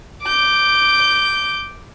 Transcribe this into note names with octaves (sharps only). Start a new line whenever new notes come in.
D6 G6